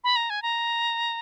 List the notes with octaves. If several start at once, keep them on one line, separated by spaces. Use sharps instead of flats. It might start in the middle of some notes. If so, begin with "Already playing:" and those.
B5
A#5
G#5
A#5